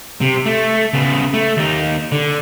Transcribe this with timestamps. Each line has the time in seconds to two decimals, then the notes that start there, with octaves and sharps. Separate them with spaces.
0.21 C3
0.46 A3
0.94 C#3 B3
1.33 A3
1.57 D#2 D#4
2.12 D3